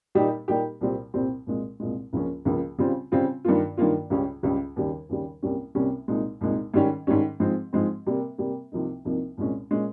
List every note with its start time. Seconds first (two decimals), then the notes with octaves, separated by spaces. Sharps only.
0.15 A#2 G3 A#3 D#4 G4
0.48 A#2 G3 A#3 D#4 G4
0.81 C2 A#2 G3 C4
1.14 C2 A#2 G3 C4
1.47 C2 A#2 G#3
1.80 C2 A#2 G#3
2.13 C#2 C#3 F3 A#3 C#4
2.45 C#2 C#3 F3 A#3 C#4
2.78 C#3 G3 C4 F4
3.12 C#3 G3 C4 F4
3.45 G2 D#3 A#3 F4
3.77 G2 D#3 A#3 F4
4.10 C#2 C#3 G3 C#4
4.43 C#2 C#3 G3 C#4
4.76 D#2 C#3 G3
5.09 D#2 C#3 G3
5.42 C2 C3 G3 A#3 C#4
5.75 C2 C3 G3 A#3 C#4
6.08 C2 A#2 G#3 D#4
6.41 C2 A#2 G#3 D#4
6.74 G#2 D#3 G3 C#4
7.07 G#2 D#3 G3 C#4
7.40 G#2 F3 G#3 C4
7.73 G#2 F3 G#3 C4
8.06 C3 G3 A#3
8.38 C3 G3 A#3
8.72 C2 C3 F3 A#3 D#4
9.05 C2 C3 F3 A#3 D#4
9.38 C2 A#2 G#3 C#4
9.71 A#2 G#3 C#4